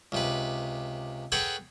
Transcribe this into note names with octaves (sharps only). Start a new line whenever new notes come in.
C#2 C3 B4
G#4 A4 B4 C#5 F#5 G5